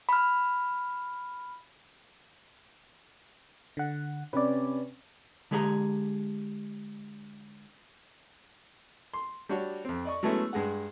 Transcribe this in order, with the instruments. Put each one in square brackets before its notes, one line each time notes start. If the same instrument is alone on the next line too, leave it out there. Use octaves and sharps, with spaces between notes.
[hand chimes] B5 F6
[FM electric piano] D3 F#5
[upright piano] C3 C#4 [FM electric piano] B4 D5
[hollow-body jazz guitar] D3 G#3 G4 G#4 D5 A#5
[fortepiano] C6
G3 D4 F#4 C#5
F2 C4
D5 D#5 C#6
F#3 G#3 A3 B3 C#4 E4
G2 G#3 G#4 F#5